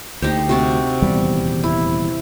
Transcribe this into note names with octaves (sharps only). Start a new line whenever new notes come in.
D2 D#4 G4 C5
C3 F#4 A5
D#1 E2 G3
E4